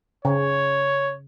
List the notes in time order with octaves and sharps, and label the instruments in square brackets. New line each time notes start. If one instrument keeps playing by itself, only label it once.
[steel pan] C#3 [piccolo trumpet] C#5